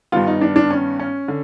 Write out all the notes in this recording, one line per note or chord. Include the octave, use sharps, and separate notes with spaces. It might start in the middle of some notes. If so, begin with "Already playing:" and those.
G2 D#3 G3 B3 F4
D#4
D4
D4
C#4
C#4
D3